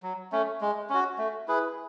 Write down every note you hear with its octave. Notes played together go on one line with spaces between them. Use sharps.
F#3
A3 C#4
G#3
C#4 F#4
A3
E4 G#4 B4